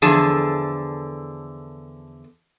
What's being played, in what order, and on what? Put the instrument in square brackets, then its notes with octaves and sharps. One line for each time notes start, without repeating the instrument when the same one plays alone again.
[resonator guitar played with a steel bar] E2 D3 F3 G#4 A4 A5